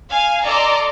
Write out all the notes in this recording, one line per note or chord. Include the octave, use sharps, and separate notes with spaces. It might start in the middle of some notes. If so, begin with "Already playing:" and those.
F5 G#5
A4 D5 D#5 A#5 C6 D6